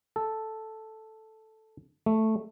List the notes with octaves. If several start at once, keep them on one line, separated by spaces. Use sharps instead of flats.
A4
A3